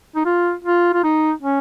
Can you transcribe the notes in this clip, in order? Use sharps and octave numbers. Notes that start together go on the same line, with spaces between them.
D#4
F4
F4
F4
D#4
C#4